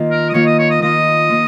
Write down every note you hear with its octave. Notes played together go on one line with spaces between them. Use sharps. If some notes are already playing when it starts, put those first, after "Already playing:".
Already playing: D#3 A#3 F4
A#4
D#5
D#3 A#3 F4 C#5
D#5
C#5
D#5
D#3 A#3 F4 D#5
D#3 A#3 F4